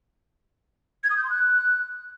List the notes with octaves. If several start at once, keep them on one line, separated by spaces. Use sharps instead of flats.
G#6
D#6
G6
C6
F#6